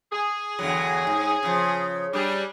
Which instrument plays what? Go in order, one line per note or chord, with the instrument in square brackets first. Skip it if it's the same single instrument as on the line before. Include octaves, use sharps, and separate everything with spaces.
[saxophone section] G#4
[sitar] E2 D3 F#3
G#2
C#3 F3
[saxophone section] G3 [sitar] D4 G#4